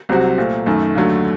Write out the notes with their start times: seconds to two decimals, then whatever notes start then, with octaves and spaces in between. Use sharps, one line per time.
0.09 C2 C3 F#3 C4 F#4
0.38 A#2 A3 C4
0.66 F#2 D#3 A3
0.95 D#2 D3 F#3 A3